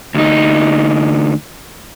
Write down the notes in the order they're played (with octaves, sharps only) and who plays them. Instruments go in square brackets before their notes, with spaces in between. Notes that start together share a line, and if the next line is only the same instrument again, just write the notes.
[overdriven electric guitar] D2 D#4